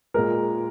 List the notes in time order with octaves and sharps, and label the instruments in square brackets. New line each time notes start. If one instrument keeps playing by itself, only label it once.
[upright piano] A#2 G#3 A#4